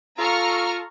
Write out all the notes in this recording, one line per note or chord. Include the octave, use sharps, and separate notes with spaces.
F4 A4 A#5 C#6 F6